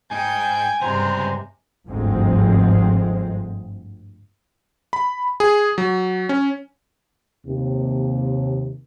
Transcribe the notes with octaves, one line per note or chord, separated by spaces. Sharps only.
G#2 D#4 G5 G#5 G6
C#2 G2 C3 G#3 C5 A#5
G1 D2 G#2 F3 G#3 C4
B5
G#4
F#3
C#4
D#2 C3